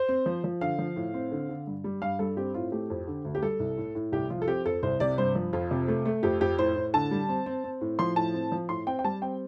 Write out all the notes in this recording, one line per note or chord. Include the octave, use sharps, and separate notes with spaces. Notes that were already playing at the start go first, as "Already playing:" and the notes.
Already playing: C5
C4
F3
F3
D3 F5
F3
A2
C4
D3
D3
G2
G3
G2 F5
G2 A4
C4 G4
A2 F4
A3 G4
F2
D3
D2
G4
G3 A4
C2
A2
A2
C2 G4
F3 F4
A4
C4 G4
F2 A4
C2 C5
C3 D5
G2 C5
F3
F2 F4
C3
A3
A3
F2 G4
F2 G4
A2 C5
A2
D3 A5
G3
C4
C4
C4
A2
F3 C6
A2 A5
C4
F3
A2 C6
C4 G5
G5
G3 A5
C4 G5